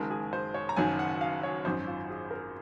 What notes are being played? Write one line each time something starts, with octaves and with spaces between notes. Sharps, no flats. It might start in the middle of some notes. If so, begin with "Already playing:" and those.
Already playing: F#1 F#2 D#3 G#3 A#4
G#4
C5
C#5
A#5
F#1 F#2 D#3 F#3 G#5
F#5
F5
C#5
G#1 F#2 D#3 F#3 C5
F4
G#4
A#4